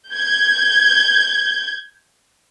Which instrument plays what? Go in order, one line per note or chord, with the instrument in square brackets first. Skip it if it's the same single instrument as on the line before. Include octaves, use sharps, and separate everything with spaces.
[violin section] G6 G#6